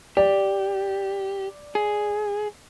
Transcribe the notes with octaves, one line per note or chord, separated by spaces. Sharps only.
G4 D5
G#4